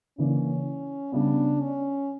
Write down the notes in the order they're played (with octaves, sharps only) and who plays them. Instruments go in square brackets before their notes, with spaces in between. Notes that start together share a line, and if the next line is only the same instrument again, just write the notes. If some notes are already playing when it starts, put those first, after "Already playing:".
[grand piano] C#3 E3 A#3 D4 [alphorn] C#4
[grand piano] C#3 G3 B3 [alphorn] D4
[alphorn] C#4